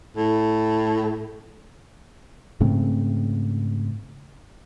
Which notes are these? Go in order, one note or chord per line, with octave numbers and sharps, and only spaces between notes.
A2
G#2 C#3 A3 C4